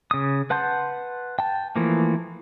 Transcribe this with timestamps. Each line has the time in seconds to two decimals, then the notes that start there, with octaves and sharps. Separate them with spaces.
0.11 C#3 D#6
0.50 B4 F#5 A5 C6 G6
1.39 G5 A5
1.76 E3 F3 A3 A#3